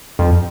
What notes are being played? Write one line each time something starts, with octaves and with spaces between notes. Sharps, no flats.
F2